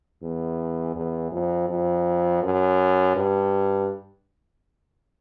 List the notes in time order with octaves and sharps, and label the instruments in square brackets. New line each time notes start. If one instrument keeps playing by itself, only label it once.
[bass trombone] E2
E2
F2
F2
F#2
G2